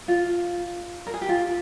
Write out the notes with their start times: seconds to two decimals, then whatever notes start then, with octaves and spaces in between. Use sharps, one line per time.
0.08 F4
1.07 A#4
1.14 G#4
1.21 G4
1.29 F4